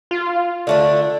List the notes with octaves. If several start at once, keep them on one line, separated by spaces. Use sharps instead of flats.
F4
D3 A3 D4